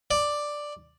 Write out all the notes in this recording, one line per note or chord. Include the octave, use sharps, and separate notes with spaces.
D5